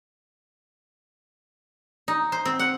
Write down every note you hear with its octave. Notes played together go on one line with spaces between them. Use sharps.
D#4
C5
C4
F#5